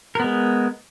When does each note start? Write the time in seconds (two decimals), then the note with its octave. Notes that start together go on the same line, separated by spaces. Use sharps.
0.15 A#4
0.20 B3
0.24 G#3